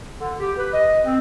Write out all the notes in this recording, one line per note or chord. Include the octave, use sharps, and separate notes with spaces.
D3
G4
B4
D#5
C4